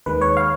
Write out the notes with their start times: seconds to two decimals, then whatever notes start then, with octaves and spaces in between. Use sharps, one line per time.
0.06 D#2 D#3 G#3 B4
0.21 C#5
0.37 F5